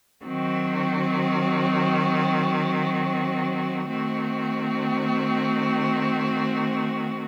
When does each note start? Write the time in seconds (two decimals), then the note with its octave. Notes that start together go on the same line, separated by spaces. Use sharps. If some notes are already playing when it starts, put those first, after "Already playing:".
0.25 D#3 F#3 C4 F#4
3.89 D#3 A3 C4 F#4